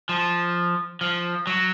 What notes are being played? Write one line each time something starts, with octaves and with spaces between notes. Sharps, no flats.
F3
F3
F#3